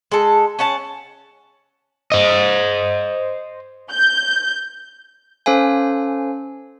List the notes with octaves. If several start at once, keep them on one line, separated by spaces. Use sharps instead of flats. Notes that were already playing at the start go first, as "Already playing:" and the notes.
G#3 A4
C#4 F#5 A5
C5 D#5
G6
C#4 A4 C5 F5 G#5